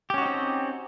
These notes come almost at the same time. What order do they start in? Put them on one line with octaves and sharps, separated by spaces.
G4 C#4 F#4 D#4 C4